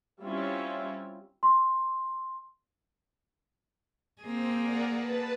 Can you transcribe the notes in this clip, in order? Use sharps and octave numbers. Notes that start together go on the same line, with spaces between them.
G3 C4 C#4 E4 F4 E5
C6
A#3 C4 G#4
A#4 D5 F#5
B4 A5